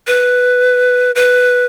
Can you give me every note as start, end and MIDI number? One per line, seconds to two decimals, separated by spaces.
0.07 1.11 71
1.15 1.65 71